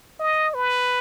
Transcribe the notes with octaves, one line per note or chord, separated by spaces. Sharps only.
D#5
B4